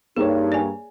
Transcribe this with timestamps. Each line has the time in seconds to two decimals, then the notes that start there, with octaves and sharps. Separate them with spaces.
0.16 G2 A#3 D#4 G#4 C#5
0.52 D5 G#5